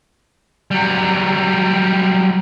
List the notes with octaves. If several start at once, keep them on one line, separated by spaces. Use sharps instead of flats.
F#3 G3